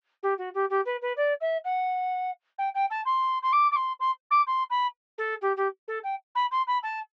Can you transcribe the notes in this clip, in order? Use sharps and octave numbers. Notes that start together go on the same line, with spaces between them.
G4
F#4
G4
G4
B4
B4
D5
E5
F#5
G5
G5
A5
C6
C6
D6
D6
C6
C6
D6
C6
B5
A4
G4
G4
A4
G5
B5
C6
B5
A5